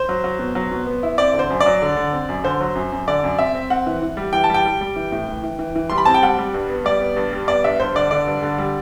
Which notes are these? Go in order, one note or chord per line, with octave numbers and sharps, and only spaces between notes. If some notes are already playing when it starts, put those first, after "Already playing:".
Already playing: C5
F#3
F#3
B2
F#3
B2
B3
E4
C4 D5
D3
C5
F#2
D5
F#3
D3
D3
C4
F#2
D3 C5
F#3
F#2
F#2
D3 D5
F#2
C4 E5
C4
C4 F#5
E3
E3
G3
E3 G5
A5
G3 G5
G3
G3
E3
A2
E3
E3
E3
E3
G3 C6
B5
C4 A5
G5
G3 F#5
G3
G2
B3
G3 D5
B3
G2
G3
B3 D5
G2 E5
G2 C5
D3 D5
D3 D5
G2
D3
G3